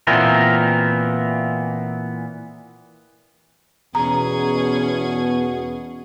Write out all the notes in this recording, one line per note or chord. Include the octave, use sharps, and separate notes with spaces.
A#2 E3 B3 C4 A#4
E2 B2 C#4 G#4 A#5